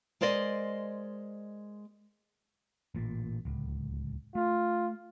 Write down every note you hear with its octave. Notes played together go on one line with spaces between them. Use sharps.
G#3 A#4 C5 D5 D#5
A1 A#2
D1 C#2
A3 F4